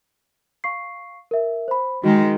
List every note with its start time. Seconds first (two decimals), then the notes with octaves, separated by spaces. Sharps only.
0.64 F5 C#6 C7
1.31 A#4 E5
1.68 C5 B5
2.04 D#3 G#3 F#4